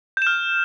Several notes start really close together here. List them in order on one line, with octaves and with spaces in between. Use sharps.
G6 E7 F6